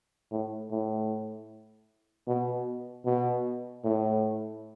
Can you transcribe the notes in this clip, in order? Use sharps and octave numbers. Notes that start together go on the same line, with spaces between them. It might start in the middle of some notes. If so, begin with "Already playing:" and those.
A2
A2
B2
B2
A2